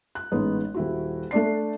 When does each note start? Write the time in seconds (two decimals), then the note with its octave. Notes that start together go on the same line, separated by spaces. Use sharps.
0.15 F#6
0.32 A1 G#3 B3 D#4
0.74 D#1 E4 F#4
1.31 A3 D4 D5 C7